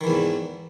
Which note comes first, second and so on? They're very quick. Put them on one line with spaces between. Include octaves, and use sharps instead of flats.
D#3 E3 E2 G#2